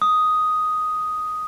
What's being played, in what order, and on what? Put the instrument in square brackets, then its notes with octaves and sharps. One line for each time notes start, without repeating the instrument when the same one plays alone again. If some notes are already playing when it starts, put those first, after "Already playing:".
[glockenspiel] D#6